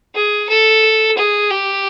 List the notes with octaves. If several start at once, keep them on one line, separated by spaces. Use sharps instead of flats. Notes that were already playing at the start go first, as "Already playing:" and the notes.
G#4
A4
G#4
G4